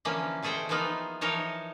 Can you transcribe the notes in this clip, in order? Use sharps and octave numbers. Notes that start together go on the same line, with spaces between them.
D3 E3 F3 A#3 C#4
B2 A3 G#4 A4 C5 G5
E3 F3 A#3 B3 D#4 F4
E3 F3 D#4 A#4 C#5 A5